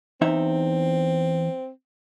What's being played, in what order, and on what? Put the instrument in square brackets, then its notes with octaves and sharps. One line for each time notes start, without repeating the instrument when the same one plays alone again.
[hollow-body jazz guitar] E2 D#4 E5 [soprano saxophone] C4